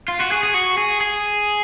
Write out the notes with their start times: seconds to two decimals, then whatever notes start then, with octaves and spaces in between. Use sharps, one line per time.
0.08 F4
0.20 F#4
0.32 G#4
0.43 G#4
0.54 F#4
0.78 G#4
1.01 G#4